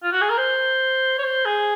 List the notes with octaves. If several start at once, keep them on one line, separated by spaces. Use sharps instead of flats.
F4
F#4
G#4
A#4
C5
C#5
C5
G#4